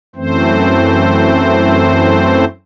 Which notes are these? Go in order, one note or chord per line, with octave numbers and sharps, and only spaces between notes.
F#2 E3 A3 C4 C5